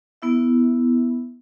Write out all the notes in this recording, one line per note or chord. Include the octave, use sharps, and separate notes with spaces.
B3 E4 E5